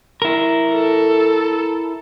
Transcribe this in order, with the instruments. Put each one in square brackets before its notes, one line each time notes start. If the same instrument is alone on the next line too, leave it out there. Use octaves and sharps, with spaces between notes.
[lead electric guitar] E4 A#4
[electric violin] A4